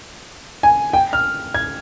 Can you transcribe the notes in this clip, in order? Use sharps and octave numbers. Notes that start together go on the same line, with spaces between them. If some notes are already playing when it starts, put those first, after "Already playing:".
G#5
G5
F6
G#6